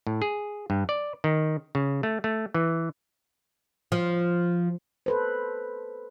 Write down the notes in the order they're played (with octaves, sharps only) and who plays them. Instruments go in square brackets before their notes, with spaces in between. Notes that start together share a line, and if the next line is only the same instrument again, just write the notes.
[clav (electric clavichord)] A2
G#4
G2
D5
D#3
C#3
A3
A3
E3
[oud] F3
[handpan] A4 B4 C5